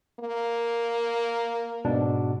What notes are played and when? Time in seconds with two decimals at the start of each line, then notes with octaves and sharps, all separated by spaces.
0.20 A#3
1.85 G#2 B2 D4